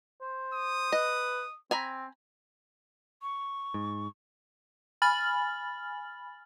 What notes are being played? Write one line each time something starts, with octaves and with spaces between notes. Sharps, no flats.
C5
D#6
B4 D#5
C4 G#5 A#5 B5
C#6
G#2
G#5 B5 F6 A6 F#7